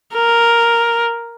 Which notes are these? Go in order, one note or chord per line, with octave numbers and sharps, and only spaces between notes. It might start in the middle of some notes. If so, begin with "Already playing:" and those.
A#4